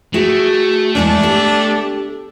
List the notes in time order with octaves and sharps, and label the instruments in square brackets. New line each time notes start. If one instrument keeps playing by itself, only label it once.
[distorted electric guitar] A3 [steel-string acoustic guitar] F#4 G#4 G5
[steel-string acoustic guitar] E2 G#3 E4 [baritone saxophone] D4
[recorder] G4 [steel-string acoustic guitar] A4